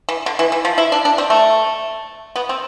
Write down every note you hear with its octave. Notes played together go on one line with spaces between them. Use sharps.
E3
D3
E3
E3
F3
E4
D4
D4
C4
A3
B3
C4